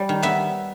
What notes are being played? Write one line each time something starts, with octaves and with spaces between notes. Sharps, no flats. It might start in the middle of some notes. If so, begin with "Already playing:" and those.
Already playing: G3
D#3
B3 E5